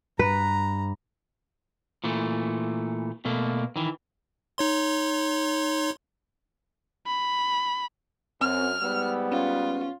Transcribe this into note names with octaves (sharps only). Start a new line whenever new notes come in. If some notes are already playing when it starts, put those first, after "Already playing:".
G2 B4 A#5
A#2 E3 A3
B2 A3 A#3
D#3 E3
D#4 C#5 C6
B5
F#2 C4 F6
G#2 G3 B3 E6
C#4 F4